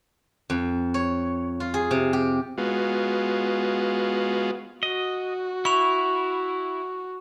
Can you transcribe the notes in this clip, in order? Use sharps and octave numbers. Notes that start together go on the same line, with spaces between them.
F2
C#5
F4
G#4
C3
G4
G#3 B3 F4 F#4
F#4 D#5
E4 C#6 F7